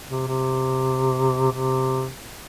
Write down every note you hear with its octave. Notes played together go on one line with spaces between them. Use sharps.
C3
C3
C3